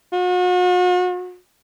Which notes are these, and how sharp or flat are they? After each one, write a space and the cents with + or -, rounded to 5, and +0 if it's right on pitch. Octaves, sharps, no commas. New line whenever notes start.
F#4 -40